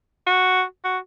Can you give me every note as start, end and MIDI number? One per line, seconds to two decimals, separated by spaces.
0.26 0.63 66
0.84 0.98 66